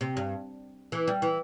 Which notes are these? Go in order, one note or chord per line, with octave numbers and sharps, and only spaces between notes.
C3
G2
E3
G3
E3